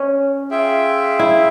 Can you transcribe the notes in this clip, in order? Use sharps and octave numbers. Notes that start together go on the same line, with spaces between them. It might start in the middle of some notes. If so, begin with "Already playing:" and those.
Already playing: C#4
F4 G#4 E5 G5
E4